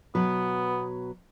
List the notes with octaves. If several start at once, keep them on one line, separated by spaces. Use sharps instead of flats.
B2 F#3 B3 B4